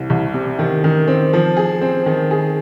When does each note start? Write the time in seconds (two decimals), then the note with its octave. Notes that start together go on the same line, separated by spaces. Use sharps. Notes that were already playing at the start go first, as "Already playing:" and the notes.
Already playing: C2
0.10 C2
0.34 C3
0.59 D#3
0.84 D#3
1.08 C4
1.33 F3
1.57 G#4
1.81 C4
2.06 D#3
2.31 G#4